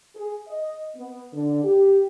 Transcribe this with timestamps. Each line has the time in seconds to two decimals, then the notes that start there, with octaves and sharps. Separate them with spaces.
0.15 G#4
0.48 D#5
0.97 B3
1.33 D3
1.64 G4